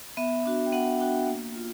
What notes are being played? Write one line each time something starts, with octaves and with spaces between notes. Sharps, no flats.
B3 E5
D4 F#4
G5
B3 F#5
D4 F#4 G5
A#3
F4